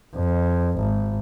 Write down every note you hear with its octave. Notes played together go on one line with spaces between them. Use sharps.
F2
G#1